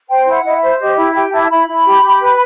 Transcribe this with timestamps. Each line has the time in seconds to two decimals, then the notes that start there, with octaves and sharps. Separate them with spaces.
0.08 C5 G5
0.26 E4
0.32 F#5
0.44 E4 D#5
0.56 E5
0.62 C5
0.79 G4 D#5
0.96 E4 E5
1.14 G4 G5
1.32 E4 A5
1.42 A5
1.49 E4 B5
1.67 E4
1.85 G4
2.02 G4
2.19 B4